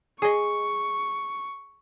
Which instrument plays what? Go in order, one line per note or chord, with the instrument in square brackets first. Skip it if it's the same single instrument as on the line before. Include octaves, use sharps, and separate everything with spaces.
[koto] G#4 D#5 [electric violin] C#6